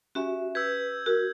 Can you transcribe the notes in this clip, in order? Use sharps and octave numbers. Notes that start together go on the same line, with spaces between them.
C#4 F#4 G4 E5 G#5
B4 E6 G6 G#6
F#4 A#4